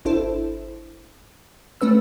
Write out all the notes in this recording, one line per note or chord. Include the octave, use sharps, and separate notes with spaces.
G#1 D4 E4 A4 C5
A3 C#4 B4 E6